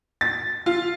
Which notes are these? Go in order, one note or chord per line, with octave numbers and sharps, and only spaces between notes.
A6
F4